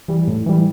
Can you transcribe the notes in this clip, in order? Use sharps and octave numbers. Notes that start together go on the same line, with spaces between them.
E3 G3
A2
E3 G3